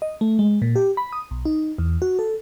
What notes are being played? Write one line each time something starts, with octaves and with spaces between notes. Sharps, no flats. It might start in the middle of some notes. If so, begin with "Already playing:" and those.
D#5
A3
G#3
A#2
G4
B5
D#6
B1
D#4
E2
F#4
A4